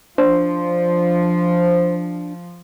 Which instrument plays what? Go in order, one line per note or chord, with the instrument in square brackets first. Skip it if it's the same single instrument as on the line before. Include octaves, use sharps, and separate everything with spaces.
[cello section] F3 [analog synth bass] D4 [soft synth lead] C5